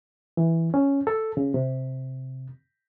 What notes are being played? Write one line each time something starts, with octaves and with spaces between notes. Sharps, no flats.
E3
C#4
A4
C#3
C3